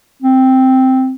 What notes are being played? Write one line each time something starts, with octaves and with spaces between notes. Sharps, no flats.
C4